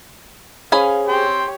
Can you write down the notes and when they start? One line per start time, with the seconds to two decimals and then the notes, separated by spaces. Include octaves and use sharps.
0.72 C#4 G#4 C5 F5 G#5 B5
1.08 G4 C#5 G5 C6